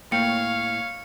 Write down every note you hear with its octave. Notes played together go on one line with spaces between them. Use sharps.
A2 A#3 C#5 F5 G5 C#7